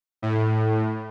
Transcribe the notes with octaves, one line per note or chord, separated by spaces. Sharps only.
A2